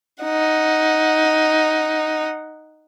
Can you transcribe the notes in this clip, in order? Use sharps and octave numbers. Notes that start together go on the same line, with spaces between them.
D#4 F#5